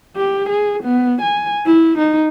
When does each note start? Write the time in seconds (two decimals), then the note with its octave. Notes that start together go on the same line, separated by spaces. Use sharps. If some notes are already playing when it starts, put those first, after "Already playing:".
0.16 G4
0.49 G#4
0.83 B3
1.21 G#5
1.66 E4
1.98 D#4